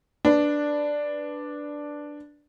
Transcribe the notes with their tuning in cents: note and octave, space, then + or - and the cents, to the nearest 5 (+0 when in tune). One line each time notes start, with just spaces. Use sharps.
D4 +0 B4 +0